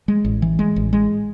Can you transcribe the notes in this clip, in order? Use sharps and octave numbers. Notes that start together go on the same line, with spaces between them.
G#3
A1
E3
G#3
A1
G#3